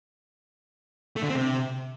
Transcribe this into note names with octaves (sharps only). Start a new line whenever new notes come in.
A3
D3
C4
C3